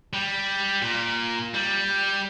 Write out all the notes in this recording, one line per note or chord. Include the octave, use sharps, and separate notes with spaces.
G3
A#2
G3